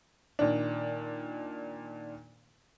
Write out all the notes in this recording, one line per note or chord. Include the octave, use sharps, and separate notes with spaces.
A#2 D#3 D4